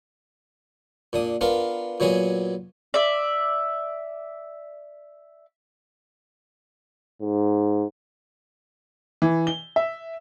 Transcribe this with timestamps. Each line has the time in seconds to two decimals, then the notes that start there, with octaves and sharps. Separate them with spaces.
1.13 A#2 D4 D#6
1.41 B3 D4 F4 A#4 B4
2.00 A#2 F#3 B3 F#4 G#4 G#5
2.94 D5 E5
7.21 G#2
9.22 E3
9.47 G7
9.76 E5